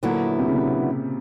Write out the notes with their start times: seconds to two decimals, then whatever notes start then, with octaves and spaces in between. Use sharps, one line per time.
0.03 A#2 D3 F#3 B3 E4
0.39 C3
0.47 C#3
0.55 C3